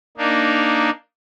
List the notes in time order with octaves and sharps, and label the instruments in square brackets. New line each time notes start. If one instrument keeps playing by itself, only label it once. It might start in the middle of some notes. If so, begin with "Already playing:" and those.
[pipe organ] A#3 D4 D#4